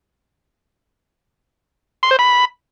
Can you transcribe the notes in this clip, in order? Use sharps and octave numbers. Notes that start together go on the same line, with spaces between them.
C6
C5
B5